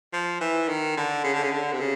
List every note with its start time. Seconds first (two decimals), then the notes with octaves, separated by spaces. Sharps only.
0.13 F3
0.41 E3
0.69 D#3
0.97 D3
1.24 C#3
1.33 D3
1.42 C#3
1.52 D3
1.72 C3
1.80 C#3